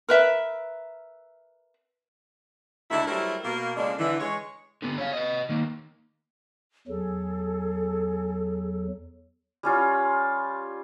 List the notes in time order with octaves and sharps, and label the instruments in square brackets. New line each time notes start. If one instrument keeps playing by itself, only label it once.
[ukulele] A#4 B4 E5
[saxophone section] D2 D3 G#3 E4
F#3 G3 A3 E4 A#4 C5
B2 A#3 A#4
F2 C#3 G#3 A#3 D4
D3 E3
G#3 C#5
[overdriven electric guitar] D3 B3
C#5 F5
B4 D#5
D#3 A#3
[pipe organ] E2 F#3 [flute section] G#4 A4
[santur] G3 C#4 F4